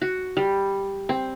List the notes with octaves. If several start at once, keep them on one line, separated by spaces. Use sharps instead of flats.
F#4
G3
C4